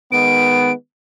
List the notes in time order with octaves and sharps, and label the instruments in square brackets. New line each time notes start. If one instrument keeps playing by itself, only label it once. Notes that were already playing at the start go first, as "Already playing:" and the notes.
[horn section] D#3 G#3 B3 [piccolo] D7